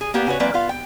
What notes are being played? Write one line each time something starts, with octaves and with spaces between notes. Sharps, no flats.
G#4
A#3 B3 G4
C#3 F#4 B4 C#5
E3 F#3 A#3 C4 B4 D5
B3 F4 F5
G5